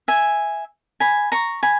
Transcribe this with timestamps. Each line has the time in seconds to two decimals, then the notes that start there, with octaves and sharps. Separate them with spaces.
0.08 E5 G#5
1.00 G#5 B5
1.32 A#5 C#6
1.63 G#5 B5